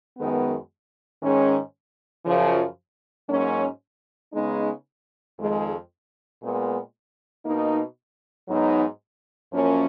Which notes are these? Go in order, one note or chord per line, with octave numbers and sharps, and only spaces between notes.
F#2 D#3 G#3 B3
G#2 D#3 G#3 C#4
F#2 C#3 F3
G#2 F#3 A#3 C#4
C#3 G#3 B3 D#4
F2 D#3 G#3
A#2 G#3 B3
B2 A#3 D#4
G#2 F#3 B3 D#4
F#2 F3 A#3 C#4